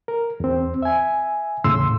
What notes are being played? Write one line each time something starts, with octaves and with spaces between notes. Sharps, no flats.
A#4
E2 C4
E5 G#5
E2 A2 C#3 C6 E6